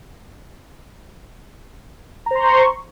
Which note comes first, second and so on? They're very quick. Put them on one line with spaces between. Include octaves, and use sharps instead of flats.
A#5 C5 C6 C#6